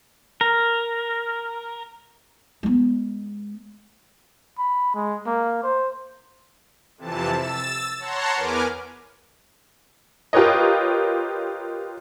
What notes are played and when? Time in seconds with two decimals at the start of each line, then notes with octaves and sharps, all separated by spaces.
0.41 A#4
2.63 G#3 B3
4.58 B5
4.95 G#3
5.26 A#3
5.63 C5
6.97 F2 C3 E3 A5
7.33 E6 A6 E7
7.99 C#5 F#5 A5 A#5 C6
8.35 E2 A#4 B4 G#5 D6 F6
10.33 F4 G4 A#4 B4 C#5 D#5